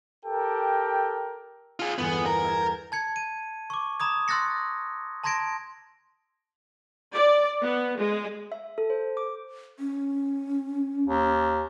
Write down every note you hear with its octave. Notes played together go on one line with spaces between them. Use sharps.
G4 A4 A#4 G5
F4 G#4
G1 E2 B3 G#4
A#4
E5 G#6 A6
G6
A5 G#6 C#7
D#7
C#6 D6
A#5 B5 D#6 G#6
C6 E6 F#6 A6 A#6 C#7
A5 A#5 C6 G#6 A#6 D7
D5
B3
G#3
E5
A4
C5
D6
C#4
D#2